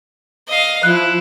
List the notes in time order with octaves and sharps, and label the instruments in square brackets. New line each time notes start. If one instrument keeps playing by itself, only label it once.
[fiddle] D#5 F5
[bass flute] F3 [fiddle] E4 [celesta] F#6